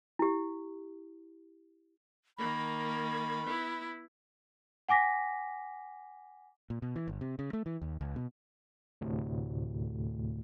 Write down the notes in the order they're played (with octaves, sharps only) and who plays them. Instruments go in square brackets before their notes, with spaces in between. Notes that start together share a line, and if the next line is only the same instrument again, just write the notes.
[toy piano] E4 G4
[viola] D#3 A#3 [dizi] B5
[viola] B3 E4
[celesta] F#5 G#5 D6 A#6 B6
[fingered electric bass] A#2
B2
E3
G1
C3
C#3
A3
E3
D#2
C#2
B2
[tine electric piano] D2 A2 C3